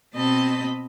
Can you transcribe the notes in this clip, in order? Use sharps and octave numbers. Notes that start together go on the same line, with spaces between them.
B2 C4 D#5 A5 B5